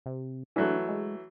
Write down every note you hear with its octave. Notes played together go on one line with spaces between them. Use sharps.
C3
E3 F#3 A3 D4
G#3